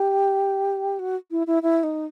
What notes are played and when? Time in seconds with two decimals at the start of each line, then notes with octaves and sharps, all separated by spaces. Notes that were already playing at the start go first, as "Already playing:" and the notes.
Already playing: G4
0.99 F#4
1.31 E4
1.47 E4
1.63 E4
1.83 D#4